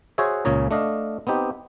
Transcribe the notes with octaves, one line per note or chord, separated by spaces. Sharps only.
F#4 G#4 C5 C#5 E5
C#2 A#2 C#3 C#4 G#4 A#5
A3 D4 D#5 F5
B3 C4 D#4 G4